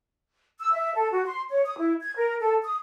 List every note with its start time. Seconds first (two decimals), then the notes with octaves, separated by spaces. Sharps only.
0.59 E6
0.72 E5
0.95 A4
1.12 F#4
1.26 C6
1.50 C#5
1.65 D#6
1.78 E4
2.01 G#6
2.16 A#4
2.40 A4
2.64 D#6